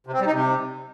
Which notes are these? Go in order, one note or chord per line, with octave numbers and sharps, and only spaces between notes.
C3
C4
G3
D#4
C3